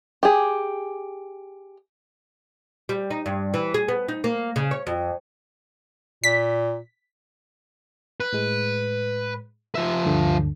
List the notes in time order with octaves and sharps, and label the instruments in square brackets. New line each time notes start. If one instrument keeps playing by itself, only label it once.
[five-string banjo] G4 G#4
[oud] G3
D#4
G2
E3
G#4
B3
D#4
A#3
C#3
C#5
F2
[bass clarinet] A#2 [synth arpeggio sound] B6
[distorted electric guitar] B4
[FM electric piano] A2 G#3
[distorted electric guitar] F3 E5
[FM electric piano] D2 G2 D3